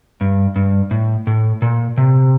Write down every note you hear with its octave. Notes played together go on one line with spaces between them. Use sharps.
G2
G2
A2
A2
A#2
C3